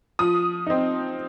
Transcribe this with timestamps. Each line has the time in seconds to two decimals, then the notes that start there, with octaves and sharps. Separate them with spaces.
0.19 F3 D#6
0.66 C4 D#4